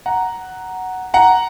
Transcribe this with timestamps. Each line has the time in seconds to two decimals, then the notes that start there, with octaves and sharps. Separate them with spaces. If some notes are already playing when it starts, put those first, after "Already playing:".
0.06 F#5 A#5
1.14 F#5 A#5